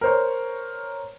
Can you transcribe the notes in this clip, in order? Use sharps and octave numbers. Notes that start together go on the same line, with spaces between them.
A#4 C5 C#5